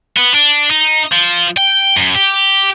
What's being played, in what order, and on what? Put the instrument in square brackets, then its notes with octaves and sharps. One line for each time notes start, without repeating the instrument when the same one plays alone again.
[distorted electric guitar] B3
D4
D#4
F3
G5
F#2
G4